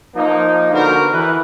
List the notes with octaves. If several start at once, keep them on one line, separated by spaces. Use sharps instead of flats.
F3 A#3 D#4
D3 B3 F#4 A#4 C5
E3 B4